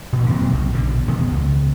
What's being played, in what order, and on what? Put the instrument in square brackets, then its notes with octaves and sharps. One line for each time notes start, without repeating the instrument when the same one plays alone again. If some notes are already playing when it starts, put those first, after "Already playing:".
[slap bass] A1 D2 A#2
D#1 D#2 F#3 C4
B1 C#3
A#1 B2 D3
D#1 E2 C3 B3
C#2